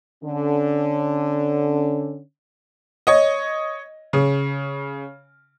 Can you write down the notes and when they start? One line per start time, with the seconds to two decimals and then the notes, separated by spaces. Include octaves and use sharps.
0.24 D3 C#4
3.07 C#5 D#5
4.13 C#3